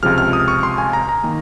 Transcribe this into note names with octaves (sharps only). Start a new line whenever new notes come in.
C#2 C3 F3 G#3 F6
F6
D#6
C#6
C6
G#5
A#5
A#5
D#3 A#3